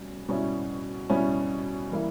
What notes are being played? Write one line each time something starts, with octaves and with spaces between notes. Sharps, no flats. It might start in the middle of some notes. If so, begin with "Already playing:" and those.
Already playing: B2 G3 C#4
B2 G3 C#4 E4
B2 G3 C#4 E4
E3 G3 A#3 E4